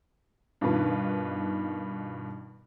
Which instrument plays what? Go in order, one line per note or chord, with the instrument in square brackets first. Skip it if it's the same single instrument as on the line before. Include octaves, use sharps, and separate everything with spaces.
[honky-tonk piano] G2 B2 D#3 F4 B4